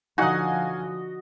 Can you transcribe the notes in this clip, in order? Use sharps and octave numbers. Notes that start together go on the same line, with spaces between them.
D3 F3 D#4 F#4 D#5 F5 F#5 G#5